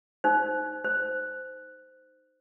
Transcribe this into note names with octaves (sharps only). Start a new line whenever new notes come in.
D#4 C5
C5